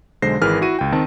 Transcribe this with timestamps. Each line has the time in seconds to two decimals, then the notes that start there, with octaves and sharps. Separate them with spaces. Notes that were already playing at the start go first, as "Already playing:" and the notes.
0.22 B1 D3 G#3 C5 A#6 C7
0.41 G#1 E3 G#4 A#4 B4 F6
0.61 E4 F#4 D#7
0.79 C#2 G5
0.92 D#3 C4 A5